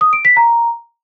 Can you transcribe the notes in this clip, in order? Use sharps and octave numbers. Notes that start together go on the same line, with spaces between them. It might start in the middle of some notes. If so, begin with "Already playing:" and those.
D#6
D7
B6
A#5